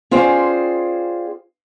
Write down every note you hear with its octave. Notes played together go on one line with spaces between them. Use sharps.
C#4 F4 G#4 C5 D5 G5